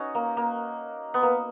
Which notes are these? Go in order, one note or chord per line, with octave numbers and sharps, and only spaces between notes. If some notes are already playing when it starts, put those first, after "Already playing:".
Already playing: C#4 D#4 F#4
A#3
A#3
B3
A#3